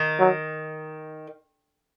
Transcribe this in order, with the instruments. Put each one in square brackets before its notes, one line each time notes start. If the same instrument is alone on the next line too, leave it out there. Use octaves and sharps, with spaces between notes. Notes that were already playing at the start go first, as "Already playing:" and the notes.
Already playing: [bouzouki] D#3
[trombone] F#3